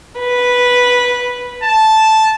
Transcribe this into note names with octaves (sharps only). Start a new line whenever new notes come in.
B4
A5